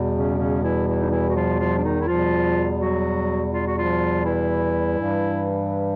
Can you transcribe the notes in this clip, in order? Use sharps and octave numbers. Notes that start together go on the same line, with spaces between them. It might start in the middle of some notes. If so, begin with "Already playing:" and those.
Already playing: E2 B2 G3
C#3 C#4
C#3 C#4
E3 E4
E3 E4
D#4
E3 E4
F#4
F3 F4
F3 F4
D4
D#3 D#4
E4
E2 B2 F3 G3 F4
F#3 F#4
F4
F#4
F3 F4
E3 E4
G2 E3 G3